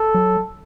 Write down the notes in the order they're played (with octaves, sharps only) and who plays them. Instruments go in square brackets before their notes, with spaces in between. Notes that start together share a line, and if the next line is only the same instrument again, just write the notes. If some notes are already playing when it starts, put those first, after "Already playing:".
Already playing: [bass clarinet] A4
[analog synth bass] F#3